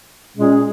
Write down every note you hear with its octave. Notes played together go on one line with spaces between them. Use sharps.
A#2 G#3 C#4 G#4